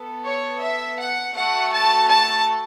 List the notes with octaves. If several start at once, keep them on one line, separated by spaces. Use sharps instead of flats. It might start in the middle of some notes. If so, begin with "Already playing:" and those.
Already playing: B3 A4
C#5
E5
F#5
A3 F#4 A4 F#5
A5
A5